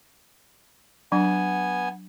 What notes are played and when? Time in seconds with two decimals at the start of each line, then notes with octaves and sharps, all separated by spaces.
1.12 F#3 B3 D4 G#5